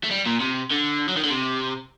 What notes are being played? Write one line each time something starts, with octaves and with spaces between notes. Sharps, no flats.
A3
G3
A#2
C3
D3
F#3
D#3
D3
C3